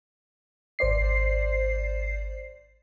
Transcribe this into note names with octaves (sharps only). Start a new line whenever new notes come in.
G#1 C5 D5 C7